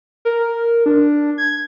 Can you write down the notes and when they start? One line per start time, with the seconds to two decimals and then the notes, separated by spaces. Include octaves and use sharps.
0.25 A#4
0.86 D4
1.38 G#6